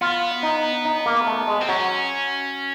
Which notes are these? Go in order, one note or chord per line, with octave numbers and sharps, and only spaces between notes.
B3 F4
D#4
D#4
A#3
A3
G#3
C4
F#3 C#4